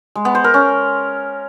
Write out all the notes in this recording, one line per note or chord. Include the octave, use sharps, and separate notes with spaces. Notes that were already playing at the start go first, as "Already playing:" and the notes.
G#3
B3
C5
A#4
C#4